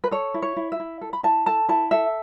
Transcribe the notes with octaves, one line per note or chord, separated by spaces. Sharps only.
B4
A4 C#5
E4
C#5
E4
E5
E4
A4
B5
E4 A5
A4 A5
E4 A5
A4 E5